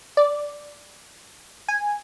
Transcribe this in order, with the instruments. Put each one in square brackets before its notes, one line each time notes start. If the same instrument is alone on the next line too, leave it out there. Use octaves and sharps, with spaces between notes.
[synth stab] D5
G#5